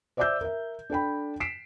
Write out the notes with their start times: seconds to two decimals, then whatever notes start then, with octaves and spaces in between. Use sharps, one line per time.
0.17 C5 D5 E5 D6 E6 G6
0.41 A#4 E5
0.90 D4 A4 G5 B5
1.40 B6 C7 D7 E7